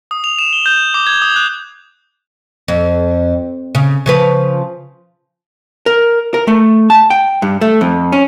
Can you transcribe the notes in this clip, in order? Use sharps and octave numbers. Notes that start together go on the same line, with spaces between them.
D#6
F7
E7
G7
G6
D6
G#6
D#6
F#6
F2
C#3
C#3 F3 B4
A#4
A#4
A3
A5
G5
G2
A3
F2
C#4